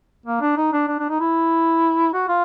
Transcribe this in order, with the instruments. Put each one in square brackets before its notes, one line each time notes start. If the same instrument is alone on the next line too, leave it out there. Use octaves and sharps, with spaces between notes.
[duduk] A#3
D4
D#4
D4
D4
D4
D#4
E4
F#4
F4